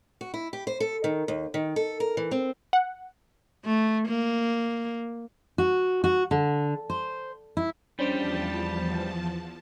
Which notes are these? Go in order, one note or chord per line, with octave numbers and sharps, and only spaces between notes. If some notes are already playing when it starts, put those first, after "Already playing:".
F#4
E4
G4
C5
A4
D#3
D#2
D#3
A4
A#4
E3
C4
F#5
A3
A#3
F#4
F#4
D3
C5
E4
E2 F3 G3 C#4 D4 G4 C5 A5